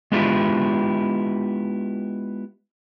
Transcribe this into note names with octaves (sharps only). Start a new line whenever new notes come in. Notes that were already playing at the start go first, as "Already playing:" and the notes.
G#3 B3 D4 E4 F4 G4